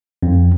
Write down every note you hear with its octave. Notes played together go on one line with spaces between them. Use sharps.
F2